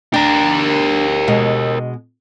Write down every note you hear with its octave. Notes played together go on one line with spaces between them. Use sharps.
D4 G4 A#4
B2 G#3